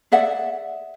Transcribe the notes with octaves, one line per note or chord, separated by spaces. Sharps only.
G#4 D5 E5 F#5